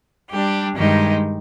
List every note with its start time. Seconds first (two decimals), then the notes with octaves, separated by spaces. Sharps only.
0.31 G3 D4 G4
0.76 G2 D#3 G#3 D#4 G4